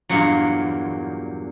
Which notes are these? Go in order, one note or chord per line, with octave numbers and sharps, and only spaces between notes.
E2 G2 A#2 F#3